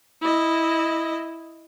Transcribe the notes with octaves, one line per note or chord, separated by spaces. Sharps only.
E4 D#5